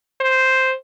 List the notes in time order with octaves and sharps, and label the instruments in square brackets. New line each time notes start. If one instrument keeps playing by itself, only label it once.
[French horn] C5